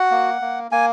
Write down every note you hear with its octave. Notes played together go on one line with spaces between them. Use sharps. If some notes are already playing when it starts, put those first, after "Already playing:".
Already playing: F#4 F#5
A#3
A#3
A#3 G#5